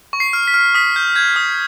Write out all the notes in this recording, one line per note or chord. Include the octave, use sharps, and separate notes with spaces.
C#6
C7
F6
B6
F6
D#6 B6
G6
G6 G#6
D#6